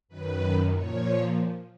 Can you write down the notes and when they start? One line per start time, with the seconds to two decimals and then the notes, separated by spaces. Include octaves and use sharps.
0.08 F#2 D#3 B4
0.72 A#2 F3 C#5